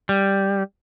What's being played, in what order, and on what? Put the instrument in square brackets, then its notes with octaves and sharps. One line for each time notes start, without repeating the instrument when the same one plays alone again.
[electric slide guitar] G3